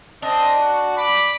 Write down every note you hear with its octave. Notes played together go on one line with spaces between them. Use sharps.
C4 D4 D#5
F#4
B5 D6